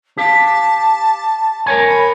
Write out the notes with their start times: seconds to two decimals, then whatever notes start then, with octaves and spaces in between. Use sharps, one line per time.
0.17 G4 F5 A5
1.66 A#4 C#5 G#5
1.88 B5